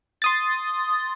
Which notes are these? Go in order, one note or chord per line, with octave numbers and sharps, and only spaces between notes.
C6 D#6 A6